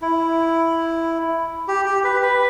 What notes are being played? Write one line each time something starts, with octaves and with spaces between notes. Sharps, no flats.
E4
G4
G4
B4
B4